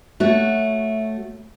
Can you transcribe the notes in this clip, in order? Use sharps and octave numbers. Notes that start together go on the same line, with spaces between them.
A3 F#4 C#5